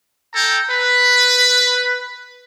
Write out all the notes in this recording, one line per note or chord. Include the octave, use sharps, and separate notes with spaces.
A4 G5 A#5
B4